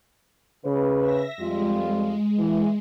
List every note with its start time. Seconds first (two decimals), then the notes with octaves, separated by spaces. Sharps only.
0.65 C#3 B4
1.01 E5 A#6
1.39 F2 G3 G#3 F4
2.39 E3